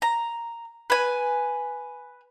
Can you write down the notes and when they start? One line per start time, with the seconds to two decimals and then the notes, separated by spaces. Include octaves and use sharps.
0.02 A#5
0.90 B4 G#5